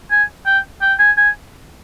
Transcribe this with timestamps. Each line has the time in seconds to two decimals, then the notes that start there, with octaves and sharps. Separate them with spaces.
0.11 G#5
0.46 G5
0.81 G5
0.99 G#5
1.17 G#5